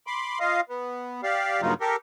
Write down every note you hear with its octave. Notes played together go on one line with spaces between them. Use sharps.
B5 C6 D6
F4 D#5 F5
B3
G4 D5 F5
G2 A#2 C#3 F#3 D#4 F4
G4 A4 A#4